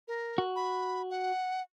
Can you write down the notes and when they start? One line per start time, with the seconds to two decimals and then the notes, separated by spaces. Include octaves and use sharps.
0.08 A#4
0.38 F#4
0.56 B5
1.10 F#5